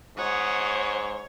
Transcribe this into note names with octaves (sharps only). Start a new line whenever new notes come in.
G#2 C#5 F#5 D#6